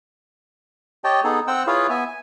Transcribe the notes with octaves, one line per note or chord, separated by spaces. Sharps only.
G4 C#5 D#5 G5 A5
B3 D#4 G#4 A4
C4 F#5 G5 E6
E4 F4 G#4 B4 C#5 F5
B3 E5 G#5
G#5